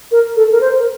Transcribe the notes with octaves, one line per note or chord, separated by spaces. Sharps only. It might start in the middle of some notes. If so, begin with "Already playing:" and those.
A#4
A4
A#4
C5
A#4